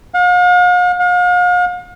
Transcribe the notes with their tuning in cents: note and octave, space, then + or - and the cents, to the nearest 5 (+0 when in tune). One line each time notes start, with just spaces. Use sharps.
F5 +45
F5 +40